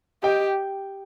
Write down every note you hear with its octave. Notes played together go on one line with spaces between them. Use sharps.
G4 D#5 G5